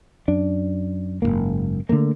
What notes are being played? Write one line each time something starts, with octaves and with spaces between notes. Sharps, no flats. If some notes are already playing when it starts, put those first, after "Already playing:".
F#2 D4
F#1 D#2 G#2 A#3
D3 F#3 A3 A#3